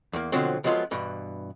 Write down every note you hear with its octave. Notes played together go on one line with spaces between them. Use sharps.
E2 A#3
B2 D3 F3 F#3 C4
F3 F#3 G#3 B3 F4 A4
G2 B2 E3